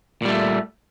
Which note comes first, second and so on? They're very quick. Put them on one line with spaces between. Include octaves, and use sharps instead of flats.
A#2 G3 A3